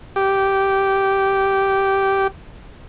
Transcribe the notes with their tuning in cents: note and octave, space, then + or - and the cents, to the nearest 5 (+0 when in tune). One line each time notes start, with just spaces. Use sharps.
G4 -10